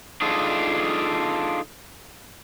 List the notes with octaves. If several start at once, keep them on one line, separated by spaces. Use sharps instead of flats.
D4 D#4 F4 G#4 A4